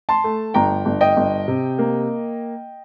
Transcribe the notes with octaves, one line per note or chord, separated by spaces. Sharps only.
A5 C6
A3
G1 G5 A#5
G1
D#5 G5
G1
C3
A#3